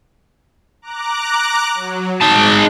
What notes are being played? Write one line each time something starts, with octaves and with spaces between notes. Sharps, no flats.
A#5 D6 F#6
F#3
G#2 G#3 D#4 A5 F#6